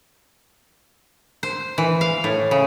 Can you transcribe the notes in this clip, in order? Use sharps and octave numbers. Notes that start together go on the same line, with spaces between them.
C5
E3
F5
A2
C#3